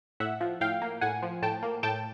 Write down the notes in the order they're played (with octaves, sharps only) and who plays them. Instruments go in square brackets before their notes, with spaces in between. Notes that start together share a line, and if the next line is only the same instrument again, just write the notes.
[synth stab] A2 E5 F#5
F3
A2 F5 G5
A#3
A2 F#5 G#5
F3
A2 G5 A5
A#3
A2 G5 A5